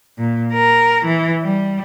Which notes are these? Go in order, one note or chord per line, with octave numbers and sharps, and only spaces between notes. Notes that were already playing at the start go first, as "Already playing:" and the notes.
A#2
A#4
E3
G3